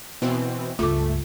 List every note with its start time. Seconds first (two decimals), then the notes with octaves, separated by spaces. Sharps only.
0.22 B2 E3 C4
0.79 C#2 G2 A3 F4 A4 D6